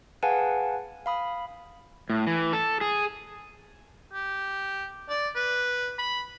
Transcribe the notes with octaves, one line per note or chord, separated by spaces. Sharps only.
G#4 B4 F5 F#5 G#5 A5
F5 B5 D#6
A2
E3
A4
G#4
G4
D5
B4
B5